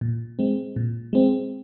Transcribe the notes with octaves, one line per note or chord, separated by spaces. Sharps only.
A#2
G#3 C4
A#2
G#3 C4